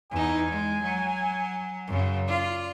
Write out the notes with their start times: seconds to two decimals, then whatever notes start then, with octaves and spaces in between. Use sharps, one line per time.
0.12 E2 D#4 G#5
0.50 G#3
0.83 F#3
1.88 F#2 C#3
2.28 F4 D5